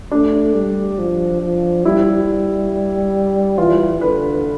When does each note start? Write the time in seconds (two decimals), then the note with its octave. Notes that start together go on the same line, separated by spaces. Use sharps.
0.11 A3 D4
0.54 G3
0.99 F3
1.42 F3
1.85 G3 E4
3.58 E3 F4
4.01 D3 B4